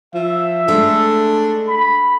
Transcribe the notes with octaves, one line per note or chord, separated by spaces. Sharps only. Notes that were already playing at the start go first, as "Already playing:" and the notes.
F3 E5
G#3 A3 D4 A4
B5